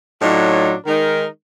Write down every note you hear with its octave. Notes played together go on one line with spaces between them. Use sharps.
A2 F#3 D4 D#4 F4
D#3 G#3 D#4 A#4